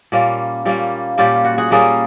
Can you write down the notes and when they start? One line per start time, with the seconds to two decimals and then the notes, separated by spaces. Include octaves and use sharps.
0.12 A#2 G3 A#3 C#4
0.65 A#2 G3 A#3 C#4
1.18 A#2 G3 A#3 C#4 F4 G4
1.45 F#4
1.58 F#4 G#4
1.70 A#2 G3 A#3 C#4 G#4 A#4